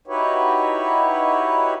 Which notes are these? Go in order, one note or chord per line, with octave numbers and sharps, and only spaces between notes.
D#4 E4 F#4 G4 B4 C#5